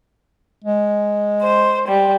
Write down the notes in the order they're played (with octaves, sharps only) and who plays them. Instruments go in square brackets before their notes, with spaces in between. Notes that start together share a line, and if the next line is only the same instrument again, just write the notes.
[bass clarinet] G#3
[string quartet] C5
G3